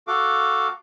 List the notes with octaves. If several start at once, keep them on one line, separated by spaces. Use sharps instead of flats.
F#4 A4 F5 D6